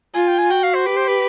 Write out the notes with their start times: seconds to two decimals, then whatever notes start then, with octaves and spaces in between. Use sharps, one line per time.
0.14 F4 G#5
0.27 G5
0.38 G#5
0.50 F#4 G5
0.63 F5
0.75 C5
0.86 G4 B4
0.96 C5
1.08 B4